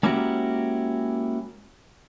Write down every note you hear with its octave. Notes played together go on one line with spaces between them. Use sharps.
G#3 A#3 C#4 E4 F#4 G4